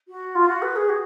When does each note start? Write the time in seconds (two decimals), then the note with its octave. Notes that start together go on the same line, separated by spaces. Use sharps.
0.08 F#4
0.35 F4
0.48 F#4
0.62 B4
0.76 G#4
0.89 F#4